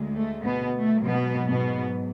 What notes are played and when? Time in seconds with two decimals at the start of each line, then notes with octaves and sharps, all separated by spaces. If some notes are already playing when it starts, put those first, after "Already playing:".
Already playing: D2 G#3
0.16 A3
0.45 B2 B3
0.75 A3
1.04 G#2 B2 F#3 B3
1.49 B2 B3